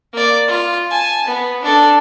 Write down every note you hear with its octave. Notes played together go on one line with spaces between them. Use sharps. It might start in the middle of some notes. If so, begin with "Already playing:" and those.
A#3 D5
F4
G#5 A5
B3
D4 A4